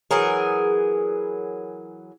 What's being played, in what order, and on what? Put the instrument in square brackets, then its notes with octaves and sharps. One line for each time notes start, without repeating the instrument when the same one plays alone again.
[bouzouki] E3 F#3 G#4 A#4